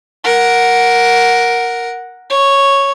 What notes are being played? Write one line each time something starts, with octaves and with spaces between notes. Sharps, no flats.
A#4 F#5
C#5